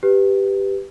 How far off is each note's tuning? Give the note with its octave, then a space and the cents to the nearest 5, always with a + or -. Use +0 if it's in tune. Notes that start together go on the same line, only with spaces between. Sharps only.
G4 +0 B4 +0